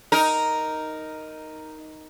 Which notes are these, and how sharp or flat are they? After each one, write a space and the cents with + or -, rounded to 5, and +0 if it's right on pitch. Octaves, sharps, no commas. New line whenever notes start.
D#4 +0 A#4 +0